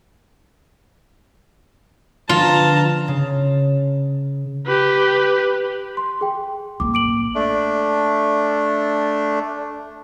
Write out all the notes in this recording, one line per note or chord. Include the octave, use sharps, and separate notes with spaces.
D3 F3 B3 F4 A5 A#5
C#3
G4 B4
C6
G#4 G5
A1 A#3 D6
D6 D7 F#7
A3 D4